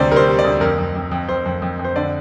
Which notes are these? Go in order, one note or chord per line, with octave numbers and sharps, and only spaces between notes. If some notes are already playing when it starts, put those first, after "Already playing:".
Already playing: D2 C3 G3 C5 D5
G3 A#4
C5
G3
D5
D2
F2 A#4
F2
F2
F2
F2 C5
F2
F2
F2
C5
D3 D5